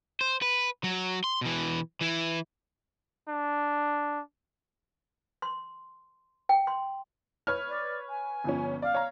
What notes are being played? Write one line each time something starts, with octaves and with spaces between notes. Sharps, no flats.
C5
B4
F#3
C6
B2 E3
E3 E4
D4
C6
G5
C6
B4 C#5 F6
D5
G#5
G1 F3 C#4
D5 F5
C#5 A#5